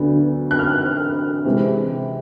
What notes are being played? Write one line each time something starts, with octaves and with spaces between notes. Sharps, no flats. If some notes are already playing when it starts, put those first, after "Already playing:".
Already playing: D2 D3 F#3 B3
F#6
F6
C3 E3 G#3